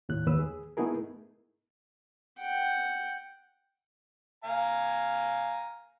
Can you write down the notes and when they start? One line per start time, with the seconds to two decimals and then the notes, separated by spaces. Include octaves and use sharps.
0.09 D#2 A2 F#6
0.26 D#2 B4 E6
0.39 G#4
0.77 A3 B3 D#4 E4 G#4 A#4
2.40 F#5 G5
4.44 F5 G#5 A#5